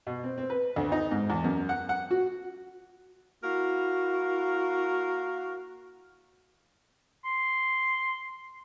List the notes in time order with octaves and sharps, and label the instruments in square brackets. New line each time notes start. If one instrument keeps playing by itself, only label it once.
[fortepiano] B2
C4
C4
B4
D2
D#4
G#2
E2
F#2
F#5
F#5
F#4
[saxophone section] A#3 A#4 F5 [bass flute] E4 [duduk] F#4
[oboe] C6